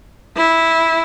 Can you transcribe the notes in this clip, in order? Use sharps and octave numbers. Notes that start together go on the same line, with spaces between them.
E4